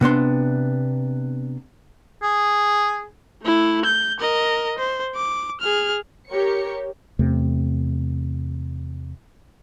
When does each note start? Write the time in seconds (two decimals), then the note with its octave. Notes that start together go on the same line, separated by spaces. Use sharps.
0.01 C3 B3 D4 C6
2.23 G#4
3.43 A3 E4
3.85 G6
4.20 A#4 D#5
4.78 C5
5.16 D6
5.60 G#4 F6
6.30 G4 A#4 C#5 C#7
7.19 E2 C3 A3